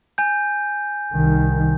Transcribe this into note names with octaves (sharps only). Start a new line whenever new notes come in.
G#5 G6
C2 D#3